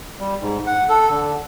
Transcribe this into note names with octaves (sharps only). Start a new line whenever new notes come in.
G3
G#2
F#5
A4
D3